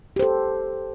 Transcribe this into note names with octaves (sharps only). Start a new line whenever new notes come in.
G4 A4 C5